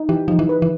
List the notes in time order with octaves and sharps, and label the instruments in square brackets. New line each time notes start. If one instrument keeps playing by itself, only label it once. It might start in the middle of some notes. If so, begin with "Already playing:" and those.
Already playing: [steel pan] D#4
[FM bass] E3 [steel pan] G4
[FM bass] F3 [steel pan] D#4
[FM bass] E3
[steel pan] B4
[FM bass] E3